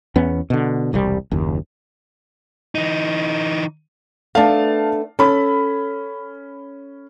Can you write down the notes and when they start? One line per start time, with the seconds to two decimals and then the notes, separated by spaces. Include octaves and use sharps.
0.16 E2 B3 C#4
0.50 B2 D3
0.93 E1 C2 A#2 G3
1.31 F#1 D#2
2.75 E3 D#4
4.35 A3 B3 D4 F5 A5
5.19 C#4 A4 B5